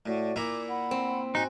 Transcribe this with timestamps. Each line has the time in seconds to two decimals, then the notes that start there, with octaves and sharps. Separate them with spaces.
0.06 A2 F#4 D5
0.36 A#2 E4 A#5 D6
0.69 F#5 B5
0.91 C4
1.35 D#4 F#4 G#5